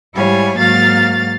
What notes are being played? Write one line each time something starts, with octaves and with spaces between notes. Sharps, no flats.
G#2 G3 E4 C#5 F5 G#5
G#2 F#3 A#3 F5 F6 A6